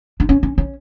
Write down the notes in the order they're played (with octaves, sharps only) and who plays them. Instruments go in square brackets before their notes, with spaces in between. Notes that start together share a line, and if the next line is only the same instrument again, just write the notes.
[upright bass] D4
C#4
C#4
C#4